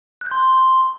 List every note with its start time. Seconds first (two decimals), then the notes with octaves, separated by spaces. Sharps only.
0.21 F#6
0.26 G6
0.31 C6